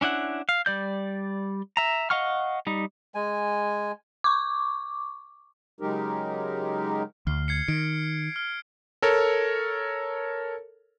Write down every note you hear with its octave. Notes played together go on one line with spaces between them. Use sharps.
C#4 D4 E4 F#5
F5
G3 D5 G6
E5 A#5
D#5 F5 F#5 C#6 F6
G3 D#4
G#3 G#5
C#6 D6
C#3 F#3 G#3 D#4 G4 A#4
D2 F6 C7
G#6 C7 C#7
D#3 D7
F6
A4 A#4 C#5